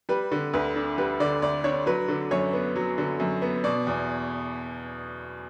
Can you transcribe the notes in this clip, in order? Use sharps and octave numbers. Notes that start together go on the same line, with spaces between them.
G3 B4
D3
D2 B4
D4
G3 B4
D3 D5
D2 D5
D4 C#5
F#3 B4
D3
F#2 C#5
B3
F#3
D3
F#2
B3
B2 D5
E2